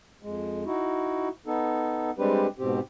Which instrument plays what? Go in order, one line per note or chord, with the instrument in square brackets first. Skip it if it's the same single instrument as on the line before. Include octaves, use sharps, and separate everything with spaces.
[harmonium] F2 G#3
D#4 E4 F#4
B3 D#4 A4
G3 G#3 C4 D4 G4 B4
G#2 B2 C4 G4